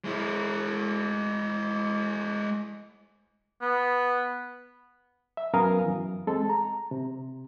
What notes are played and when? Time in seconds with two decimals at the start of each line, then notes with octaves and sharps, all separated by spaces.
0.05 G#3 E4
3.62 B3
5.37 E5
5.53 F#2 B3 A#4 F5 G#5 D#6
5.85 F#2 E3
6.27 G#3 C4 A4
6.49 A#5
6.91 C3